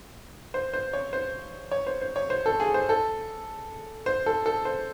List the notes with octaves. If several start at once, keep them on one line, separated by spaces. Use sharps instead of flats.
C5
C5
C#5
C5
C#5
C5
C5
C#5
C5
A4
G#4
C5
A4
C5
A4
A4
C5